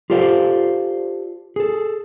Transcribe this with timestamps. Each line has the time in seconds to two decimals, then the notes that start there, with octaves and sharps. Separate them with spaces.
0.10 F4 G4 A4 C5 D5 F5
1.56 G#4 A4